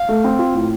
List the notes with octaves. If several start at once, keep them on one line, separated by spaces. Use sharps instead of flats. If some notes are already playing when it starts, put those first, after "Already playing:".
Already playing: F5
A3
C4
F4
A2